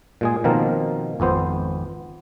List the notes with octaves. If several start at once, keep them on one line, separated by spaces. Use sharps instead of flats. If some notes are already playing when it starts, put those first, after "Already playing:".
A#2 G#3 G#4
B2 D#3 F3 A#3 C4 A#4
G#1 F2 B3 C5